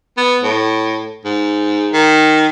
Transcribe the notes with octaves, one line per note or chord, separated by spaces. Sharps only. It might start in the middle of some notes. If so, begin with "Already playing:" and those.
B3
A2
G#2
D#3